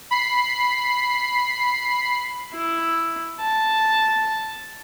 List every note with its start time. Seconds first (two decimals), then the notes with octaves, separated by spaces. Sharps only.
0.11 B5 C7
2.53 E4
3.40 A5